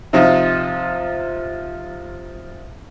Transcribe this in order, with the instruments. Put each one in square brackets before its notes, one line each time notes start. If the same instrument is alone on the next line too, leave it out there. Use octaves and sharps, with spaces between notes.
[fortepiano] C3 F3 D#4 F4